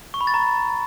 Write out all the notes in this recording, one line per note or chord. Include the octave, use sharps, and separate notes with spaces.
C#6
B5
A6
A#5